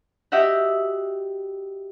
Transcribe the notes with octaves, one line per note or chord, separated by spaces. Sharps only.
F#4 G4 D#5 E5 F#5